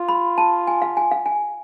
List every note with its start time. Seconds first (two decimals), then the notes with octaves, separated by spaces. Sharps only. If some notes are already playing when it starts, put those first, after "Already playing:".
Already playing: F4
0.09 B5
0.38 A5
0.67 G#5
0.82 F5
0.97 G#5
1.11 F5
1.26 G#5